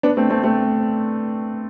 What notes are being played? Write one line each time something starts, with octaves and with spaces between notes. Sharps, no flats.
B3 D4
A3 C4
A3 C4
A3 C4